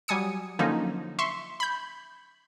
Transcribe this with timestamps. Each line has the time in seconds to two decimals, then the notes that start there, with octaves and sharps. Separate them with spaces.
0.08 F#3 G3 G#5 D#6 C#7
0.59 D3 F3 F#3 A#3 C#4 D#4
1.19 E5 C6 C#6
1.60 B5 G6